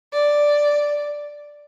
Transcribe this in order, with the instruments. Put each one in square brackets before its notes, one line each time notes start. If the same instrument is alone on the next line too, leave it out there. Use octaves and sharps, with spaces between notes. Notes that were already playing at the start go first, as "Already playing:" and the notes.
[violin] D5